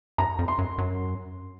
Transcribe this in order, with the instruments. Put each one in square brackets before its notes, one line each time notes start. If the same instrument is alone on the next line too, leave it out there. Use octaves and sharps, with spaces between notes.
[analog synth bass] F#2 [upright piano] A#5
[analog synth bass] F2
[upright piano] C6
[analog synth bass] F#2
F#2